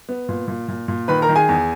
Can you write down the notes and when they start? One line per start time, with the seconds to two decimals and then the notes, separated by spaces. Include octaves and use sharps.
0.09 B3
0.29 A#2
0.48 A#2
0.68 A#2
0.88 A#2
1.08 D#3 B4 B5
1.22 A#4 A#5
1.29 D#3
1.36 G#4 G#5
1.49 E2